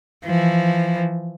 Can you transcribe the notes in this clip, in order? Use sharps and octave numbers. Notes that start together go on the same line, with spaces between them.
E3 F3